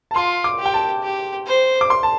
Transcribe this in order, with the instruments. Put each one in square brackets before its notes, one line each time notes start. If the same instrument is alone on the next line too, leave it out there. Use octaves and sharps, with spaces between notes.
[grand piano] A5
[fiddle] F4 [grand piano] C6
[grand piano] D6
[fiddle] G4
[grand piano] G5
A5
[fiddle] G4
C5
[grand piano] D6
C6
A5